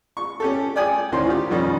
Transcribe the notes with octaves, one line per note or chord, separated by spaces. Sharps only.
C#6
C#4 G4 A4
D5 G5 G#5 D#6
D2 A2 D#3 C#4 C5 C6
F4 G4
F2 B2 D#3 G3 C#4